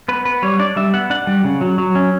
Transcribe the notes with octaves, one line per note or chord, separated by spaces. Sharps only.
B3 B4
B3 B4
G3 C#5
D4 D5
G3 E5
B3 F#5
D4 F#5
G3
C#3
F#3
F#3
C#4